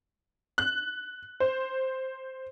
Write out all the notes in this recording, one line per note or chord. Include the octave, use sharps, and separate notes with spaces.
F#6
C5